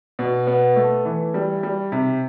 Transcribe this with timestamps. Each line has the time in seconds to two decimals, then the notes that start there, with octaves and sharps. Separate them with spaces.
0.19 B2
0.47 B3
0.76 A3
1.05 E3
1.34 G3
1.63 G3
1.92 C3